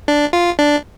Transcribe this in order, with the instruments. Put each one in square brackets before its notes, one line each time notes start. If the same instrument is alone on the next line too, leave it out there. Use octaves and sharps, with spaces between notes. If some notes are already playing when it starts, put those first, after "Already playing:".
[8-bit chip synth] D4
F4
D4